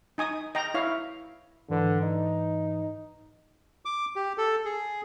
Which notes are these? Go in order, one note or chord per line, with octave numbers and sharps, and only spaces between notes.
D#4 G#5 D#6
D#5 G5 A#5
E4 C#5 F5
G#2 D3 E3 B4
D#4
D6
G4
A4
G#4